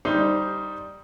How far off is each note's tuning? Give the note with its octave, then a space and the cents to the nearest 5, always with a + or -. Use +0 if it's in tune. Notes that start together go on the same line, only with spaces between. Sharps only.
G3 +0 D#4 +10 C5 +0